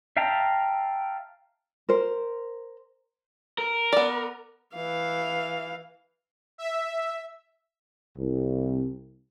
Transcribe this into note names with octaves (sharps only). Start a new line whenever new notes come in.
E5 F5 G5 A5 A#5
A#4 C5
A#4
B3 D5
E3 F5
E5
C2